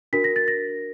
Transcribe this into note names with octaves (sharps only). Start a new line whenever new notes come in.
D4 F#4 A#4 B6
A#6
A6
A#6